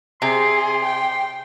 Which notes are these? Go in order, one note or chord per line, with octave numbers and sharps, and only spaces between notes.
C3 G#4 C6
G5